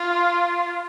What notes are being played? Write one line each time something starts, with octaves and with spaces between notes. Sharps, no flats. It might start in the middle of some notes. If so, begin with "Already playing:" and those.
Already playing: F4